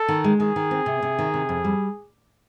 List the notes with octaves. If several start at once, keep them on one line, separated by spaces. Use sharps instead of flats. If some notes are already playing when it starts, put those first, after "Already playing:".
Already playing: A4
D#3
G#3
D#3 G#4
D#3
C4
C3
C3
D#3
C3
F2
G3